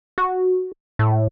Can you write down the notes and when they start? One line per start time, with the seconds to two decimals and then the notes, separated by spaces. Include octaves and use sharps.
0.18 F#4
0.99 A2